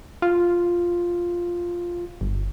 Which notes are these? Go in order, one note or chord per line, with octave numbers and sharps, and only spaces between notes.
F4
G1